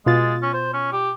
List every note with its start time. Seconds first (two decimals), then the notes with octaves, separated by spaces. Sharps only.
0.06 B2 G#3 F4 A6
0.42 C#4
0.54 C5
0.74 C#4
0.93 G4